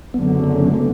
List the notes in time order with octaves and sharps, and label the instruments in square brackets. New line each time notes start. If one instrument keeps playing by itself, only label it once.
[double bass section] F#1 F#2 D3 [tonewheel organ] B3
[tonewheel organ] B3
C#4
B3
A3
B3